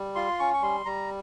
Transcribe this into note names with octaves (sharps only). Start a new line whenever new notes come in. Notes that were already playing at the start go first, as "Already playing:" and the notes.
Already playing: G3
F4 C6
C#4 C#6
C#6
G3 C6
G3 A#5